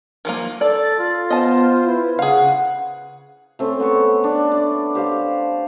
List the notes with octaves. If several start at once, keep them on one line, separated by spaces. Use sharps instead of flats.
D#3 F3 A#3
A4 D5 A6
F4
B3 C5 D#5 A5
E4 B4
C#3 G#4 F5 F#5
A3 C4 C#4
B3 C#6
D4
D5
G4 C5 F5